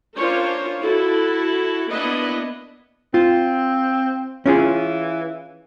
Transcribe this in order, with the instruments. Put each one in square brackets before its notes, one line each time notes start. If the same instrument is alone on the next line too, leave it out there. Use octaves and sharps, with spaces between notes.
[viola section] C#4 D4 F4 A#4 C5 C#5
E4 F#4 A4
A#3 B3 D4 E4 B4 D#5
[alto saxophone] C4 [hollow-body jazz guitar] F4
[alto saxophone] E3 [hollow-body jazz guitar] C#4 F4 G#4